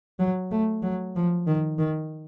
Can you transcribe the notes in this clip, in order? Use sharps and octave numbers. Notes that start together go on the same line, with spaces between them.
F#3
A3
F#3
F3
D#3
D#3